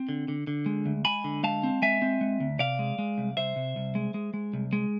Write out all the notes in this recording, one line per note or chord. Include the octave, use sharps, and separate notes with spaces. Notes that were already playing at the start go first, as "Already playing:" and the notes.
Already playing: C4
D3
D3
D3
G#3
D2
G#3 G#5 B5
D3
G#3 F5 A5
C4
G#3 E5 G#5
C4
G#3
D2
C3 D5 F5
G#3
G#3
C2
C2 C5 E5
C3
C2
G#3
G#3
G#3
C2
G#3